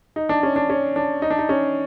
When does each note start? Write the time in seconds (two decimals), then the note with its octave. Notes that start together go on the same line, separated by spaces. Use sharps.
0.16 D#4
0.29 D4
0.43 C#4
0.56 D4
0.70 C#4
0.96 D4
1.22 D#4
1.30 D4
1.39 D#4
1.49 C#4